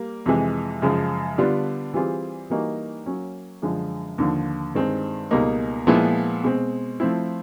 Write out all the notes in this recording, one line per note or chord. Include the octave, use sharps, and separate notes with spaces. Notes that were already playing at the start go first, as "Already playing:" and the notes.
Already playing: G3 A#3
F2 C3 E3 G#3
F#2 C#3 F3 G#3
D3 G3 B3 D4 F4
E3 G3 C4 F4 G#4
E3 G3 A#3 D#4 F#4
F#3 A#3 C#4
F#2 D3 F3 G#3
D#2 D3 F3
G2 D#3 G#3 C4
C#2 B2 G3 A#3 D#4
A#2 F3 G#3 B3 E4
B2 G#3 C4
F3 A3 C4 E4